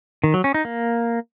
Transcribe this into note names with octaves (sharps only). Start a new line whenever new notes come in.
D#3
F#3
C#4
D#4
A#3